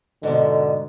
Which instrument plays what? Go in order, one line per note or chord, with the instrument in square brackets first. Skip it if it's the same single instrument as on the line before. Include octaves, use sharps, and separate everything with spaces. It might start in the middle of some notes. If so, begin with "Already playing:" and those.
[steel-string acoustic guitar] G#2 B2 [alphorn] D3